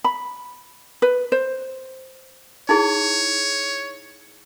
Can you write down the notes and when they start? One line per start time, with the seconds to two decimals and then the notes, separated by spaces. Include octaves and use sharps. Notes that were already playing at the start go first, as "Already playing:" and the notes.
0.04 B5
1.02 B4
1.32 C5
2.69 D#4 E4 G#4 C#5